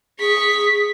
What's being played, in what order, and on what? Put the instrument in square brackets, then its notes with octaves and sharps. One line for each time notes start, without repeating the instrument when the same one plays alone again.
[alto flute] G#4 [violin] C#6 B6